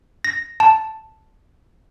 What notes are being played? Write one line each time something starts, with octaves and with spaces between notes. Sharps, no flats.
A#6
A5